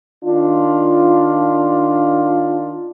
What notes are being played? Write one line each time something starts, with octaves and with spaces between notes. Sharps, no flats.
D#3 D4 F4